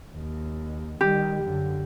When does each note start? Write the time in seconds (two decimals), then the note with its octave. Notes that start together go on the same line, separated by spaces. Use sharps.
0.11 D#2
1.01 D#3 G3 G4
1.44 F#2 D3